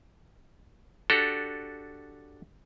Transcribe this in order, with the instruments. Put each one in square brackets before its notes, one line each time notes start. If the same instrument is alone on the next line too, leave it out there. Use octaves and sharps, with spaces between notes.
[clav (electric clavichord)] D4 F#4 G4 A4